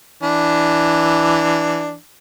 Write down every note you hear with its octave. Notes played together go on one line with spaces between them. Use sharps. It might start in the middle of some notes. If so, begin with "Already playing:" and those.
E3 D4